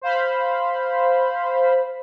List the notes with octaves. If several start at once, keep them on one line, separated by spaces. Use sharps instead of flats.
C5 F5 B5